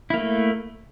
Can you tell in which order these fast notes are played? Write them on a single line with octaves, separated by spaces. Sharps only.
E4 A#3 A3